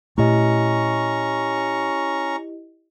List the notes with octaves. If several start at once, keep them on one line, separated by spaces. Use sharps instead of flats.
A#2 A3 C#4 E4 G4 D#5 A#5 C#6